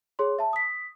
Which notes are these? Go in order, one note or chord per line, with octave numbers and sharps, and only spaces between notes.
G#4 C#5 C6
E5 A5
D#6 B6